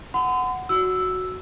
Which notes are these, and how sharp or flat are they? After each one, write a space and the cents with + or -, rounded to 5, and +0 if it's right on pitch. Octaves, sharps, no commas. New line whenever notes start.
F#5 +0 C6 -45
F#4 +0 E6 +0